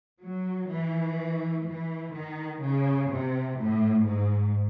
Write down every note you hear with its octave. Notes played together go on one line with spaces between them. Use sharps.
F#3
E3
E3
D#3
C#3
C3
A2
G#2